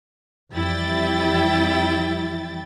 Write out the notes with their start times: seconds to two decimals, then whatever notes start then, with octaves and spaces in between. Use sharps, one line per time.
0.53 F2 E3 G3 E4 G5 A6